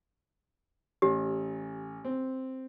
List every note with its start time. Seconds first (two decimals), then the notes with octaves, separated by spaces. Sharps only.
1.02 A1 G4
2.04 C4